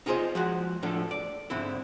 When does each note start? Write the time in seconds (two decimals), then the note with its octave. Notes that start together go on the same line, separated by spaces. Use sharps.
0.06 D#4 F4 G#4 A#4 C5 D#5
0.35 F3 G#3 F#4
0.82 A2 D3 F3 D4 A4
1.11 D5
1.50 G#2 D3 C4 E4